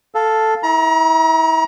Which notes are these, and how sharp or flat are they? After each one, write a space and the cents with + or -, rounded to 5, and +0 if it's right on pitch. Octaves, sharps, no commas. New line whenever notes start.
A4 +0 F5 +0
E4 -30 A#5 +35